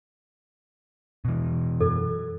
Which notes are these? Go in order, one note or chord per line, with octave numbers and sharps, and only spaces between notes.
B2 E3
F#2 A4